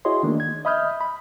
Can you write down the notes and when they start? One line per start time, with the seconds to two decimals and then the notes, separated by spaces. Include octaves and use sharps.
0.05 E4 F#4 G#4 C#5 D#5 C6
0.23 D#3 A3 A#3 D4
0.40 G#6
0.65 D#5 E5 B5 D#6 F6 G6
1.01 B5